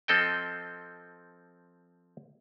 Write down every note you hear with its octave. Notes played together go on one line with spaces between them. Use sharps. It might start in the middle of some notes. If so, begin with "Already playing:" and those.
F3 C4 A4 D#5 G5